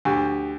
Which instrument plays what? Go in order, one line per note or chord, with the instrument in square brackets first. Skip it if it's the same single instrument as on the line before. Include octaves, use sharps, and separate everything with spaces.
[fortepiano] D2 [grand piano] G4